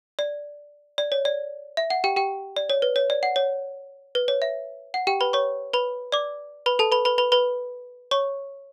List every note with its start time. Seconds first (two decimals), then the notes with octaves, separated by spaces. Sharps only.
0.19 D5
0.98 D5
1.12 C#5
1.25 D5
1.77 E5
1.90 F#5
2.04 G4 G5
2.16 G4 G5
2.57 D5
2.70 C#5
2.82 B4
2.96 C#5
3.10 D5
3.23 F#5
3.36 C#5
4.15 B4
4.28 C#5
4.42 E5
4.94 F#5
5.07 G4 G5
5.21 B4 B5
5.33 C#5 C#6
5.73 B4 B5
6.12 D5 D6
6.66 B4 B5
6.79 A4 A5
6.92 B4 B5
7.05 B4 B5
7.18 B4 B5
7.32 B4 B5
8.11 C#5 C#6